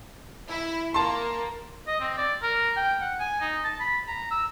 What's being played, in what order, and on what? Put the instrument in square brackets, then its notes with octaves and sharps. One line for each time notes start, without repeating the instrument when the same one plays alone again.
[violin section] E4
[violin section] A#3 [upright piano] A5 C6
[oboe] D#5
C4
D5
A#4
G5
F#5
G#5
D#4
A5
B5
A#5
E6